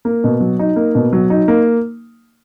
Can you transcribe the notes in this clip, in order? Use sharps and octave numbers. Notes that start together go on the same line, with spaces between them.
A#3
B2
F#3
D#4
A#3
B2
F#3
D#4
A#3